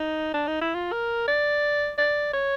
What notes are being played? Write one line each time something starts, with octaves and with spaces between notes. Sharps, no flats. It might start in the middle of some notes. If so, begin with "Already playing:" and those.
Already playing: D#4
D4
D#4
E4
F4
A#4
D5
D5
C#5